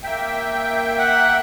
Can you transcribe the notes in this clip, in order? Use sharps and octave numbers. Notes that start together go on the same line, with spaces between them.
A#3 E5 G5
F#5